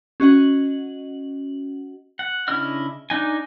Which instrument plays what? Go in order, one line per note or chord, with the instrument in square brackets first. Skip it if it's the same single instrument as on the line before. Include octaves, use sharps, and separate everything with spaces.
[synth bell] C#4 F#4 D#5 F#5 F#7
[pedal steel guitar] F#5
C#3 D4 E4 D#5 F6
D4 D#4 G#5